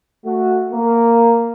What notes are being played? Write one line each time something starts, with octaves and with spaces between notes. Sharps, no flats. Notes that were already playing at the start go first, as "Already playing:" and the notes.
A3 F#4
A#3